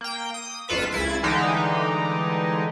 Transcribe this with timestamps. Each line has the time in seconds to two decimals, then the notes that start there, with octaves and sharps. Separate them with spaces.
0.01 A#3 G5
0.34 D#6
0.68 G1 F2 F4 A4 B4 B6
0.91 C#2 E4 G#6 A6
1.23 D3 E3 G3 G#3 D#4 G4